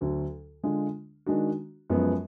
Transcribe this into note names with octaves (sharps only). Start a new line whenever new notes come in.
D2 D3 F#3
D3 G#3 D4 F4
D#3 G#3 D4 F#4
F#2 F3 G#3 B3